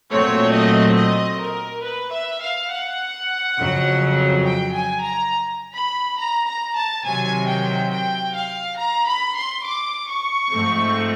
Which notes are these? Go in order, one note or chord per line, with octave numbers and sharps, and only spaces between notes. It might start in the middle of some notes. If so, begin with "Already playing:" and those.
A#2 F#3 A3 C4 C#5
D#5
D#5
A#4
B4
E5
F5
F#5
F2 C#3 F#3
G5
G#5
A#5
B5
A#5
A#5
A5
C3 D#3 F#3 G#5
G5
G5
F5
A#5
B5
C6
D6
C#6
G#2 F3 A3 C4